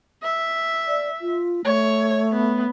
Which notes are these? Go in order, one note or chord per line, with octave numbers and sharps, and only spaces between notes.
E5
D5
F4
A3 C#5
B3